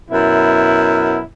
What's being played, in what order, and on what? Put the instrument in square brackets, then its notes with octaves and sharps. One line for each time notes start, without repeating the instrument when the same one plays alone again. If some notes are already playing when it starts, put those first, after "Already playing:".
[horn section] F#2 B2 E4